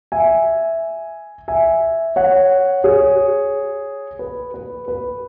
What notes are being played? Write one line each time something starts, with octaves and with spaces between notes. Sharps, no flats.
E5 G#5
E5 G#5
C#5 F#5
G#4 C#5
B4
B4
B4